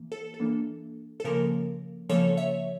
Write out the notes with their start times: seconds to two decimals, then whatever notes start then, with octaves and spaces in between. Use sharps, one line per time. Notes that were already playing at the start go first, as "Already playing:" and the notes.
Already playing: E3 A#3
0.12 A4
0.34 A4
0.40 E3 A#3 D4
1.20 A4
1.24 C#3 F3 A#3 A#4
2.09 C#3 F3 A#3 A4 C#5
2.37 C#5 E5